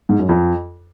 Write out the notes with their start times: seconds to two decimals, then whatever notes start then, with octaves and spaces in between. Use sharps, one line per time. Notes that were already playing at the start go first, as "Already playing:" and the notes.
0.09 G#2
0.19 F#2
0.29 F2